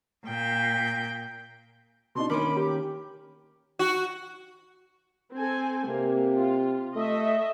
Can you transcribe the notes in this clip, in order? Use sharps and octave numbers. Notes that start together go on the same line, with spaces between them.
A#2 G5
B2 D4 D#4 C6
D#3 A#3 C#4 A#4 B5 D6
G4
F#4
C4 A4 G#5
C3 A#3
F4
A3 D#5 E5